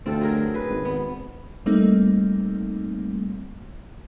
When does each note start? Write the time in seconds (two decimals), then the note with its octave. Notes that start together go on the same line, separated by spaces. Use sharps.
0.06 D2 C4 F4 A4
0.21 F#3 G#4 A#4
0.54 G#4 B4
0.69 G#1
0.85 B3
1.66 G3 A3 A#3 C4 D#4